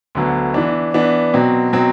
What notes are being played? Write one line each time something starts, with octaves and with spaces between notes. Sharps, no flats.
D2 D3 F#3 B3
E3 B3 D4
E3 B3 D4
B2 F#3 C4
B2 F#3 C4